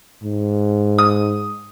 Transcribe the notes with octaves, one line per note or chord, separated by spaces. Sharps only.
G#2
D#6